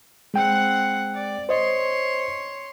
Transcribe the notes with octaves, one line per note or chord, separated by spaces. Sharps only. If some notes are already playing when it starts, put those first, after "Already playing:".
G#3 C4 F#5 G5
D5
C5 C#5 D#5 C6